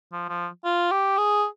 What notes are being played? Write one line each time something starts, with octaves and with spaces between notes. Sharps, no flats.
F3
F3
F4
G4
G#4